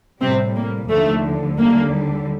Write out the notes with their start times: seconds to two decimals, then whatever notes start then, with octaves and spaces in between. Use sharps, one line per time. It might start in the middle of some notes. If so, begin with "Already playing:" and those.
0.21 A2 C3 G3 C4
0.55 A#3
0.90 D#2 D3 F3 A3
1.58 D#2 D3 G3 A#3